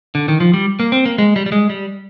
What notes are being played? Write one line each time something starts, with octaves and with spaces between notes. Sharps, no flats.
D3
D#3
F3
G3
A#3
C4
A#3
G#3
G3
G3
G#3
G3